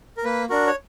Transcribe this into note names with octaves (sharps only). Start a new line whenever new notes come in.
A#4
A#3 B4
D4 F#4 A#4
C#5